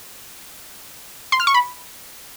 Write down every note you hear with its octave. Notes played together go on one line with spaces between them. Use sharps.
C6
F6
C#6
B5